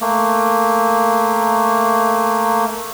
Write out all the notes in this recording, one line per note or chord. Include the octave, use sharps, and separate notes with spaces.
A3 A#3